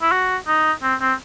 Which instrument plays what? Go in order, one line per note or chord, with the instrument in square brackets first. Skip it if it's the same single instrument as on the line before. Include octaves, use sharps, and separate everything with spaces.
[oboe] E4
F#4
D#4
C4
C4